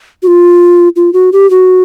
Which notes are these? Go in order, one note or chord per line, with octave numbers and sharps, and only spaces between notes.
F#4
F4
F4
F#4
G4
F#4